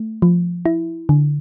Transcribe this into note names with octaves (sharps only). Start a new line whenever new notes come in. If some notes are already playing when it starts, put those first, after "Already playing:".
Already playing: A3
F3
E4
D3